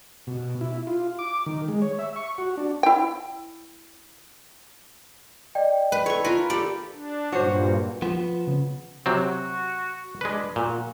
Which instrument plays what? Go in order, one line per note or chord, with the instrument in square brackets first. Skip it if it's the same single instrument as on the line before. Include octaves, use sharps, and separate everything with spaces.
[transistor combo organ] B2
E4
F4
D6
D#3
G#3
C#5
E5
C#6
F#4
D4
[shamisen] E4 G5
[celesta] D5 D#5 G5
[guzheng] B4
[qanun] A4 C#6 [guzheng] C#5
[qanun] F4 A#4 [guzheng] B4
[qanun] G4 A4 [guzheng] D5
[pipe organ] D4
[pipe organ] G2 A#2 [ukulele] D4 C5 [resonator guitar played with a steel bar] F#4 C#5
[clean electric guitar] F3 B3
[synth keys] C#3
[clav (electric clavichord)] C3 F#3 C4 [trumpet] F#4
[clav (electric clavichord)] G#3 B4 [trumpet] D4
[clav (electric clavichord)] A#2 [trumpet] F#4